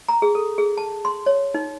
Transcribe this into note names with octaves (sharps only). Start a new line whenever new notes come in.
A#5
G#4
A4
G#4
A5
C6
C#5
D#4